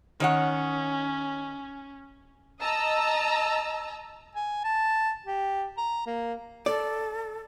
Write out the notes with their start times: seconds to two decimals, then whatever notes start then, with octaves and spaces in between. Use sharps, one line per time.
0.20 D#3 C#4 C#5 F#5
2.59 D#5 A5 A#5 E6
4.35 G#5
4.64 A5
5.26 G4
5.77 A#5
6.06 A#3
6.66 A4 D5